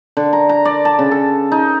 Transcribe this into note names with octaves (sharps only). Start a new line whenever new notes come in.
D3
A#5
A#5
D5
A5
C#3
A4
D#4